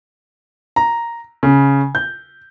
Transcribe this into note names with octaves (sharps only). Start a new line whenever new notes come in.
A#5
C#3
G6